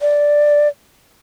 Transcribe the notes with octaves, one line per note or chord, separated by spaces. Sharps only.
D5